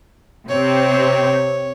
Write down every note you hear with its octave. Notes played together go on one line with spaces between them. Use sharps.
C3 C4 C#5